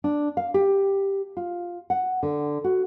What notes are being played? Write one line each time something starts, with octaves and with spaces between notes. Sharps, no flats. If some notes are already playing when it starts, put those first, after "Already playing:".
D4
F5
G4
F4
F#5
D3
F#4